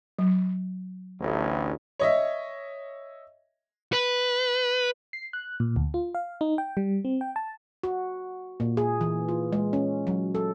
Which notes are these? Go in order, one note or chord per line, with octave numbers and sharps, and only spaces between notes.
F#3
A1 D2
C#5 D#5 E5
B4
C7
F#6
A#2
D2
F4
F5
D#4
G5
G3
C4
G5
A5
F#4
A#2
G#4
E3
F4
G#3
C#4
F#3
A4